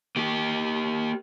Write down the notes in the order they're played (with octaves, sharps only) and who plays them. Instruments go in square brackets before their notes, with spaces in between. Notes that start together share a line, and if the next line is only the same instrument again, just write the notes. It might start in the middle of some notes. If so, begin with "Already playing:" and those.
[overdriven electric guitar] A#3 G4